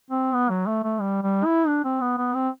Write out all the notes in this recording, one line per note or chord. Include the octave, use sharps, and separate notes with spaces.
C4
B3
F#3
A3
A3
G3
G3
E4
D4
C4
B3
B3
C4